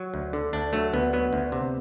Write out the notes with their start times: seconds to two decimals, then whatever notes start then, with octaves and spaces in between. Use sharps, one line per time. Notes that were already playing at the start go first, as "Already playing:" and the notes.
Already playing: F#3
0.14 D2
0.33 D3
0.53 D2 D4
0.73 F#3 A3
0.93 D2 B3
1.13 F#3 B3
1.33 D2
1.52 C3